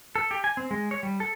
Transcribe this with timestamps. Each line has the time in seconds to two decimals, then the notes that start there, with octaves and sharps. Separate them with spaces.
0.16 A4
0.31 G4
0.44 G#5
0.57 C4
0.71 G#3
0.91 C#5
1.03 G3
1.20 A4